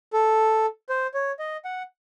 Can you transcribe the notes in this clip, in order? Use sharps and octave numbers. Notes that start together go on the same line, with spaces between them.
A4
C5
C#5
D#5
F#5